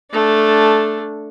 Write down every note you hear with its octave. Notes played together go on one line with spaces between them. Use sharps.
A3 D4